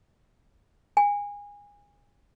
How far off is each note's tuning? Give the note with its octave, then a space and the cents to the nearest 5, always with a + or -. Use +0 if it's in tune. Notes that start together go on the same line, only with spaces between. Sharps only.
G#5 -25